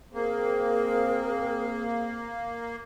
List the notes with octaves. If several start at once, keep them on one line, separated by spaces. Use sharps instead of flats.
A#3 C4 G#4 A#4